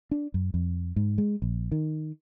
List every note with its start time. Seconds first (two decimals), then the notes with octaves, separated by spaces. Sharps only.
0.11 D4
0.34 F#2
0.54 F2
0.96 G#2
1.18 G#3
1.42 A#1
1.72 D#3